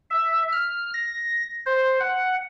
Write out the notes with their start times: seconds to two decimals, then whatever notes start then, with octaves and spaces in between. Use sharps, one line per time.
0.10 E5
0.52 F6
0.94 A#6
1.66 C5
2.00 F#5